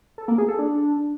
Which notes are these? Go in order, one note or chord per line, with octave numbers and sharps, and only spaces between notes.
A4
A#3
G#4
A4
D4